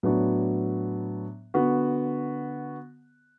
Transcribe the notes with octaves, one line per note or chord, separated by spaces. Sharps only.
A2 F#3 B3 D4 F#4
D3 B3 F#4